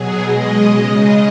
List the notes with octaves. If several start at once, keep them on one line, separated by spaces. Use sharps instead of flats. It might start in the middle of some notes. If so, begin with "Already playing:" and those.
Already playing: B2 F#3 G#4
B2 G#3 D#5
C#3 G#3 D#5